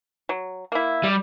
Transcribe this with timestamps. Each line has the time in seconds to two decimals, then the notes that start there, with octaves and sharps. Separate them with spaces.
0.29 F#3
0.72 A#3 E4
1.03 G3